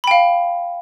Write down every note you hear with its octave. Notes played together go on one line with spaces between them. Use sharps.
F5 G5 B5